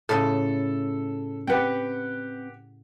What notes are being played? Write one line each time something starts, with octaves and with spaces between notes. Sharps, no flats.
A2 C#3 A4 A5
C4 G4 B4 F#5 G5